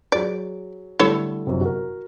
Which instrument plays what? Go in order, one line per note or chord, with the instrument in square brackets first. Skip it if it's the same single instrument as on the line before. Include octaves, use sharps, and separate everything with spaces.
[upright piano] F#3 G#4 [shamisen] D5
[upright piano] D3 G3 A3 [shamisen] E4 A4 C#5
[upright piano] G1 F#2 C3
F#4 A#4